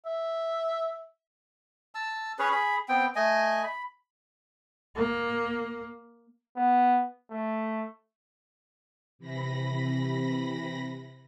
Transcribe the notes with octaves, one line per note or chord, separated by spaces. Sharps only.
E5
A5 E6
C#4 G#4 B4 C#5
G#4 B5
B3 C4 G5
A3 D#5 G#5
B5
A#3
B3
A3
C3 E3 B5 A#6